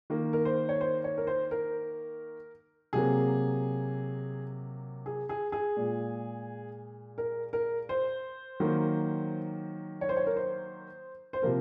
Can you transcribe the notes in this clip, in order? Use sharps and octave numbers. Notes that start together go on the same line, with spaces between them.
D#3 A#3
A#4
C5
C#5
C5
C#5
A#4
C5
A#4
C3 F#3 A#3 G#4
G#4
G#4
G#4
A#2 G#3
A#4
A#4
C5
D#3 F#3 A#3
C#5
C5
C#5
A#4
C5
C5
C3 F3 A#3 A#4